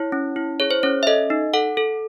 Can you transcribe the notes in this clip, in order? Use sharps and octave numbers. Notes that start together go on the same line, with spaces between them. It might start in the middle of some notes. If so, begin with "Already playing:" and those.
Already playing: E4 C#5
C#4
E4
G#4 C#5
C5
C#4 C#5
E5
A4 D#5
D#4
A4 F#5
A4